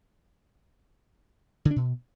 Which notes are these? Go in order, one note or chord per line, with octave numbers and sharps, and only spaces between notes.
D3
D4
B2